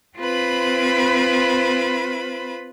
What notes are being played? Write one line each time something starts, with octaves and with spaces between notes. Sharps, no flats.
C4 F4 B4 C5 B5